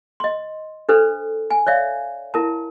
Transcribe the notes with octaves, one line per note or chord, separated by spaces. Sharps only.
D#5 C6
D4 A4 B4 C5
G#5
C#5 D5 E5 F5
E4 A#4 A5